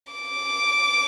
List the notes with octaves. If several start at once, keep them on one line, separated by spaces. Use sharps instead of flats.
D6